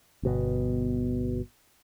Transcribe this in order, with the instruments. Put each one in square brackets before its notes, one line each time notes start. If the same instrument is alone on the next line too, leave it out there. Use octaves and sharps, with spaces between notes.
[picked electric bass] G1 B2 B3